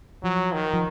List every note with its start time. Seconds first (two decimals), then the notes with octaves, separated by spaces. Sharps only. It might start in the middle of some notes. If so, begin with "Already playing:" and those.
0.23 F3 F#3
0.53 D#3
0.73 F3